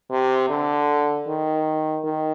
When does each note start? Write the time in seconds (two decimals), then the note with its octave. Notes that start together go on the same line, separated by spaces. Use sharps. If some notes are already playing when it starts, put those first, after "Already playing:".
0.11 C3
0.49 D3
1.27 D#3
2.04 D#3